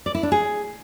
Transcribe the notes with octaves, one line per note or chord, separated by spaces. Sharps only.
D5
E4
D4
G#4